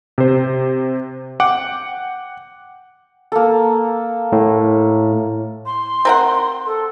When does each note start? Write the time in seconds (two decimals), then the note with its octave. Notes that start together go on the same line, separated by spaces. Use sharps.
0.18 C3 C5
1.40 F#5 G5 D6
3.32 A#3 A4
4.32 A2
5.65 C6
6.05 C4 A#4 F#5
6.65 A4